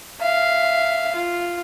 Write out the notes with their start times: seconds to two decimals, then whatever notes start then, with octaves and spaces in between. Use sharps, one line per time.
0.21 E5 F5
1.16 F4